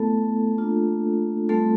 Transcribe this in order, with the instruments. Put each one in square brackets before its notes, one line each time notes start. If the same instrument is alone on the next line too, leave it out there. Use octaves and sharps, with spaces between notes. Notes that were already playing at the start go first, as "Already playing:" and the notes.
Already playing: [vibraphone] A3 B3 E4 A4
A#3 D4 F4
G3 A3 C4 F4 A4